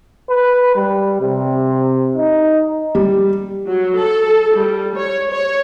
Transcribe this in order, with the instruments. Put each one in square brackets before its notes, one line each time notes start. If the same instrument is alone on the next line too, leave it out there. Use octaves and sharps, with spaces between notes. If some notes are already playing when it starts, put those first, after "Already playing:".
[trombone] B4
G3
C3
D#4
[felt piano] G3
[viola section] F#3
A4
G3
C#5
C#5